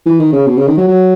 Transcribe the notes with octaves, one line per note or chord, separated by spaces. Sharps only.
E3
D#3
C#3
B2
C#3
D#3
F#3
F#3